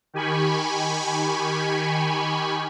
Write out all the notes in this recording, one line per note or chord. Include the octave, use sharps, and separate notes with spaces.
D#3 G4 G#5 B5 C#6